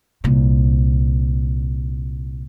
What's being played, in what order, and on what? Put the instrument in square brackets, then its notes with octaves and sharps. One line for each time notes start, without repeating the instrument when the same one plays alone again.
[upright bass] C2 A#2